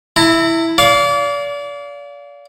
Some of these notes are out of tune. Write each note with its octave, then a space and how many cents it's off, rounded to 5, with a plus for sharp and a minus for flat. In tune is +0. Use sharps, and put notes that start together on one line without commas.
E4 +0 A#5 -40
D5 -35 F5 +0